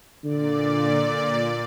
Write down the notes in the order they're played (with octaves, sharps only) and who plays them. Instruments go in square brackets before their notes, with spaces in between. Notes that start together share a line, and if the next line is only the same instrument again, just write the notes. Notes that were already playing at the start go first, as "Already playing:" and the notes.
[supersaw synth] A#2 D5 [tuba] D3